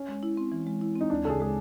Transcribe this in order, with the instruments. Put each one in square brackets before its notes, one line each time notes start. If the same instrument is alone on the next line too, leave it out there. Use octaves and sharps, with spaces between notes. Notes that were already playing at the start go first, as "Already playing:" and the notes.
Already playing: [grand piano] C#4
[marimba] G#3
E4
C4
E3
G#3
E4
[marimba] C4 [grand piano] D#4
[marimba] D2 [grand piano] D4
[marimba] C#3 [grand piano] A4
[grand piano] G#4
[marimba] G#3 [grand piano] G#4